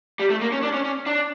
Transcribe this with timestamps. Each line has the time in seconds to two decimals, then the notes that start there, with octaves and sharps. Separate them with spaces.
0.20 G3
0.30 A3
0.41 A#3
0.52 C#4
0.63 D4
0.74 C#4
0.85 C#4
1.06 D4